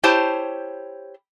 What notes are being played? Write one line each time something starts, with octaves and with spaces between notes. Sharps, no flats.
E4 G4 C5 C#5 A5